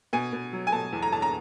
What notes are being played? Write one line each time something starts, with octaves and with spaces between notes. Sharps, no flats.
B2 G#5
B2
F#3
G#5
B2 A5
E2
A#5
E2 A5
A#5